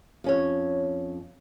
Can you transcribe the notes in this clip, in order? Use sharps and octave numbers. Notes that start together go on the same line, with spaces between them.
F2 C#4 C#5